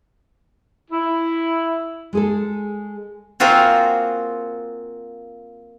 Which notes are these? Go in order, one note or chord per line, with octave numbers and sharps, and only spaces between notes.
E4
G#3 G#4 A4
A#3 C4 F4 F#4 G#4